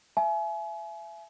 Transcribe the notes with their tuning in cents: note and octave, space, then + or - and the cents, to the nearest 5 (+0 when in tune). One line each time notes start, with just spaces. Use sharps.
E5 +30 G#5 +35